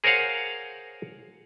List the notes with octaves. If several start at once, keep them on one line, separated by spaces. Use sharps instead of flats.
G#4 A#4 C5 C#5 F5 F#5